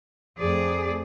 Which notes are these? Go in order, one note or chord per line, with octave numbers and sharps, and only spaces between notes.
F2 A3 G#4 D5